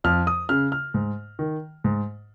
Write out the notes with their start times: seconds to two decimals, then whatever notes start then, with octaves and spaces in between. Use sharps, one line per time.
0.04 F2 F6
0.27 D#6
0.49 C#3 F6
0.72 F6
0.94 G#2
1.39 D#3
1.84 G#2